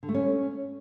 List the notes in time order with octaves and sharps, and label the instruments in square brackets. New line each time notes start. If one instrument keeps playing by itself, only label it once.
[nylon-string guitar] D3
A3
C#4